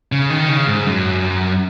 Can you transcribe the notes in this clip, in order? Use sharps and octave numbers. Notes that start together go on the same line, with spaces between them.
C#3
D#3
C#3
G#2
F#2